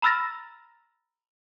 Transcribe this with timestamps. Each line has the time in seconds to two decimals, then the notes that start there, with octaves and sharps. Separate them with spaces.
0.02 A#5 B5 E6 F6 A6 A#6